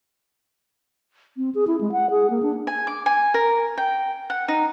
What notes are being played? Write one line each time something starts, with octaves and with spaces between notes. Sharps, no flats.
C4
G#4
E4
G#3
F#5
G#4
A#3
D4
G#5
D6
G#5
A#4
G5
F#5
D#4